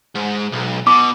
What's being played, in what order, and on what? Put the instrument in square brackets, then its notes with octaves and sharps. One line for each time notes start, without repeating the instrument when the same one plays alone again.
[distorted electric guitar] G#2
B1
[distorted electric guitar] B2 [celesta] D6